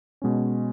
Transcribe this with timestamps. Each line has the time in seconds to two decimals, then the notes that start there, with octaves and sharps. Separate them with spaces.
0.22 B2 G#3 C#4